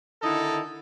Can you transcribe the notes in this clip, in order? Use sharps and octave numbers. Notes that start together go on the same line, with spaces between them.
D3 D#3 D#4 E4 A4